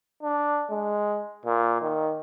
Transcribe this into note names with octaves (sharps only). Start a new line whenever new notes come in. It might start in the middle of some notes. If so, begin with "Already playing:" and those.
D4
G#3
A#2
D#3